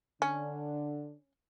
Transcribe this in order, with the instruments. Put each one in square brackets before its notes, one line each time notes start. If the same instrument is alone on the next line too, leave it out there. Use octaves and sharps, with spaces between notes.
[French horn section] D3 D4 [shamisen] C#4